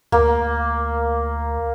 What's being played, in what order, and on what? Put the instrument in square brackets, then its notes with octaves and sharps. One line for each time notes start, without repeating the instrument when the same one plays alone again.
[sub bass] D2 [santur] A#3